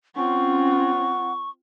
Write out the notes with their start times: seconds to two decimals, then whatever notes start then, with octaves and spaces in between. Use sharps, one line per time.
0.16 C4 C#4 F4 F#5 C#6